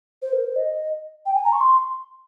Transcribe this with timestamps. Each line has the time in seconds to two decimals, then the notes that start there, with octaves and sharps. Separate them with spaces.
0.22 C5
0.33 A#4
0.45 C5
0.56 D#5
1.26 G5
1.35 G#5
1.44 A#5
1.53 C#6
1.61 C6